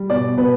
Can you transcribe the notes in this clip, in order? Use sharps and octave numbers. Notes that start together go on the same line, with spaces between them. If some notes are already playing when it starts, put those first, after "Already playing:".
Already playing: G3
B2 D5
B2 B4